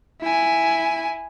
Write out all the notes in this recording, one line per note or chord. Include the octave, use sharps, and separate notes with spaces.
E4 G#5